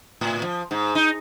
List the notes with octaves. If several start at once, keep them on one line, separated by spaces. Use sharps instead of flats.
A2
F3
G#2
D#4